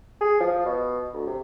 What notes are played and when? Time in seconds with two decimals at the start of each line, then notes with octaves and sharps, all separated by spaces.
0.21 G#4
0.40 F3
0.66 B2
1.14 D2
1.27 C3